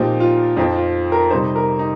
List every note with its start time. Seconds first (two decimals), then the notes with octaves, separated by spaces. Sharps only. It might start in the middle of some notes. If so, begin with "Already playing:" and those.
Already playing: A#2 F3 C4 D#4 G4
0.20 F4
0.57 F2 F3 C4 D#4
0.76 F4
1.12 A#4
1.31 C3 G3 D#4 C5
1.56 A#4
1.79 D#4